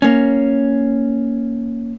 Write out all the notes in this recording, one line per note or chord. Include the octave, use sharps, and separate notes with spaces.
A#3 C#4